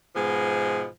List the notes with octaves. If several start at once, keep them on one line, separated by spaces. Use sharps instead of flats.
G#2 B2 F3 G#3 B3